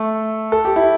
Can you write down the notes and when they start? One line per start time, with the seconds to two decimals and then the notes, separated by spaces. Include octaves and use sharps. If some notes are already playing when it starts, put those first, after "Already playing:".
Already playing: A3 A4
0.52 A4
0.65 G4
0.76 E4